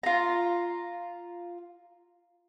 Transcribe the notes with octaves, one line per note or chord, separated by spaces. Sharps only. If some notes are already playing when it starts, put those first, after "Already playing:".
F4 A#5